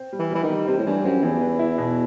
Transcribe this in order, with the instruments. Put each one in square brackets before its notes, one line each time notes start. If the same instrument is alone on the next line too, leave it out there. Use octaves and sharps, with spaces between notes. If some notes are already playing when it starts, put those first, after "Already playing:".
Already playing: [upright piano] C4
G3
[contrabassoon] E3
[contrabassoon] E3 [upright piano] G3
[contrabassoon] D#3
[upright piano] G3
[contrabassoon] C3 [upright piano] C4
[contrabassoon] A2
[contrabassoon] G2 [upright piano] E3
[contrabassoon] F#2 [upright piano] C4
[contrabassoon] E2 [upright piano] E3
[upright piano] B4
E4
B2